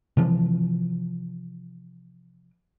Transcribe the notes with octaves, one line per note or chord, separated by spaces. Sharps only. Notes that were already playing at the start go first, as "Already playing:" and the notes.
C3 E3 F3